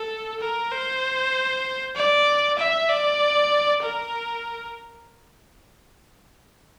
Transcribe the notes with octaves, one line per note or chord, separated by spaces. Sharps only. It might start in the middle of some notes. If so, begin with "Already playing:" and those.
Already playing: A4
A#4
C5
D5
E5
D5
A#4